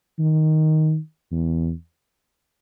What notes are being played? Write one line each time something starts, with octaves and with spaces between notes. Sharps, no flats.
D#3
E2